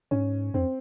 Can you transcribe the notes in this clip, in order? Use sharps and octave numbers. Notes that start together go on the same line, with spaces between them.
G#2 C#4
F2 C4